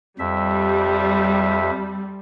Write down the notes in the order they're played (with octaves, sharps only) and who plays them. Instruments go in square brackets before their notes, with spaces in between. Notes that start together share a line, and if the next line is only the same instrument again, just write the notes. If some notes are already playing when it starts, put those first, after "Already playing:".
[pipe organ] F2 E5 [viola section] G3